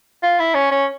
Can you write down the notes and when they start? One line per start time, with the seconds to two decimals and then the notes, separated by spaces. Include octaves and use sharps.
0.23 F4
0.39 E4
0.54 C#4
0.71 C#4